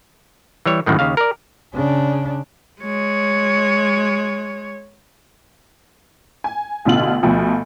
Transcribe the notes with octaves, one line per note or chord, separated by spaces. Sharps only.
E3 G3 C#5
G#1 F#2 A2 D#3
D#2 C#3 F5
A#4 D5
C#3 D4
G#3 C#5
G#5
A1 B2 D3 F4 F#7
D2 B2 F3